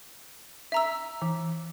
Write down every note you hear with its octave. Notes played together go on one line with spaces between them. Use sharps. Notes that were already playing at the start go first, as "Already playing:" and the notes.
E5 A#5 E6
E3